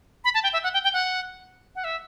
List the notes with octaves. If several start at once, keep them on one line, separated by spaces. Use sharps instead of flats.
B5
A5
G5
E5
F#5
G5
G5
F#5
F#5
E5